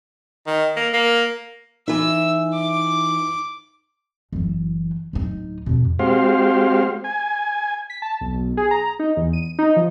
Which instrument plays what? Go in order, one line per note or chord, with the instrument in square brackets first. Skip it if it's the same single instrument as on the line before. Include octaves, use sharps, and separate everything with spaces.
[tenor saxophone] D#3
A#3
A#3
[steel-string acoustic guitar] E3 E5 [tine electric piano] D#4 [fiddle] E6
[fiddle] D6
[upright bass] F#1 E3
D1 D#4
F2 B2
[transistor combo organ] G#3 C4 F#4 G4 C5 F5
G#5
[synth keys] B6
A5
B1
B1
G#4
A#5
D#4
E2
D#7
D#4
F3